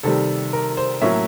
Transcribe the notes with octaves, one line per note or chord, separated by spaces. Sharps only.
C3 D#3 G3 A4
A#4
C5
A2 F#3 A#3 C#4 E5